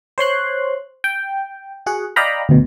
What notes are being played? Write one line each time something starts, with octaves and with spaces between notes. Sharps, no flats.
C5 C#5 C6 F#6
G5
F#4 G#4 F#5
D5 D#5 F5 G5 A#5 B5
D2 B2